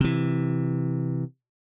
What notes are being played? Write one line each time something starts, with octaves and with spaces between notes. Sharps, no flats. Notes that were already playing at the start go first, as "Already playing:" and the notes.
C3 E3